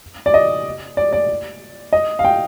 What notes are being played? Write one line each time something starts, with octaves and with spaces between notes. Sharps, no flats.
D5
D#5
D5
D5
D#5
F5
G5